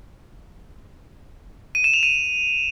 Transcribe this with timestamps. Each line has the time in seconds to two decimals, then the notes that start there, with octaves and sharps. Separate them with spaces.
1.75 D#7
1.84 E7
1.94 F7
2.03 D#7